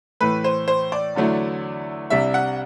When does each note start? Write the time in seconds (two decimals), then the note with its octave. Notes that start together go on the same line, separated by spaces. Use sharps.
0.20 A2 E3 A3 B4
0.44 C5
0.68 C5
0.92 D5
1.15 E2 D3 F#3 A3 E4
2.10 C2 C3 G3 D4 E5
2.34 F#5